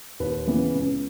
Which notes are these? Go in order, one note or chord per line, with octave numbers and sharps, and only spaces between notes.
D#2 B4
C#3 E3 B3
C#2